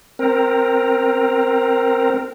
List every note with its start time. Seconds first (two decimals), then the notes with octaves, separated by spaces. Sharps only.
0.19 C4 A#4